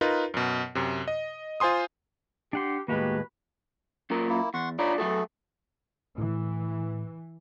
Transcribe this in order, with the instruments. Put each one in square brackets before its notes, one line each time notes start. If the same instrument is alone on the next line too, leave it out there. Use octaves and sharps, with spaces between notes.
[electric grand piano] D#4 F4 A#4 B4
F#2 B2
F#2 C3
D#5
F4 C5 G#5 C6 D#6
[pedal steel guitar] D4 F#5 C6 [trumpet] G4
[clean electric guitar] D#2 A2 G#3 [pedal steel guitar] A#3 F#4 G4 [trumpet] B4
[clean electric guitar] F#2 A#2 A#4
[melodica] A#3 E4
[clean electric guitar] E2 [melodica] F#5 C6 C#6
[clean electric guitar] D4 F4 D5 [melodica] D#4 C#5 B5
[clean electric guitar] F#3 F#4 A4 [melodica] A3 G#4
[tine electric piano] A2 [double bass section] E3